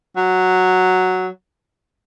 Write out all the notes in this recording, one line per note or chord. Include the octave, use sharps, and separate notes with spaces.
F#3